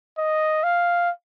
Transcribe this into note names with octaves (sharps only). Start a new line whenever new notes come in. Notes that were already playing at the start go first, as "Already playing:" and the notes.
D#5
F5